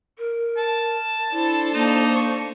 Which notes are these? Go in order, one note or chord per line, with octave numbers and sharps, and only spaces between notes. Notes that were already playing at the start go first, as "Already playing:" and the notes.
A#4
A5
D4 E4 A4 C5
A#3 D#4
C#6